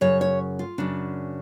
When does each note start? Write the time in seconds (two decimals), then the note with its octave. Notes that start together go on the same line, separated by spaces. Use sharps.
0.01 F#2 C#3 C#5
0.21 C#5
0.59 F4
0.78 F#2 C#3 D4